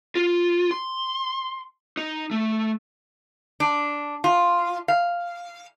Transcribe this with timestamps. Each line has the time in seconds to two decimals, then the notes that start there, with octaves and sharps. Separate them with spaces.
0.15 F4
0.71 C6
1.97 D#4
2.31 A3
3.60 D4
4.24 F4
4.88 F5